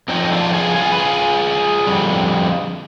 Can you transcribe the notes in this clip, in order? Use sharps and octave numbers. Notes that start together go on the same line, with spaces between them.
F2 D3 F3 C4 D#4
D4 F4
F4 G#4
F4 G#4
B4
F4 G#4
F2 D3 G3